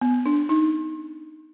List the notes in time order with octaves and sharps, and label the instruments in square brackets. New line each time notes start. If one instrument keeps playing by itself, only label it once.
[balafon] B3
D4
D#4